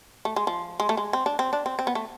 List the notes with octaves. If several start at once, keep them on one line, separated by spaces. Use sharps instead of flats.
A3
G#3
F3
G#3
A3
G#3
C4
D4
C4
D4
C4
C4
B3
A3